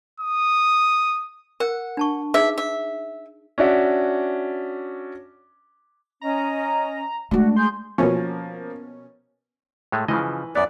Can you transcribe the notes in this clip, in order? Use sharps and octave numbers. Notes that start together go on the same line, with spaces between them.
D#6
A#4 F#5
D4 A5 C#6
D#4 G#4 E5
E5
C#4 D4 F#4 D5 E5
C#4 D#5 A#5
G#3 A3 D4 F#4
G#4 C6 G6
B2 F3 A#3 C#4
A2 G#3 A3
C#3 E3 F3 D#5
F#2 B3 D5